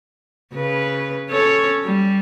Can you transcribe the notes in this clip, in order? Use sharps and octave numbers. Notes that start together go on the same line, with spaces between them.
C#3 B4
C#4 A4 C#5
G3